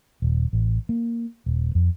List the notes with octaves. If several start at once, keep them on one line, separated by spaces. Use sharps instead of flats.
D#1
A1
A#3
D#1
F2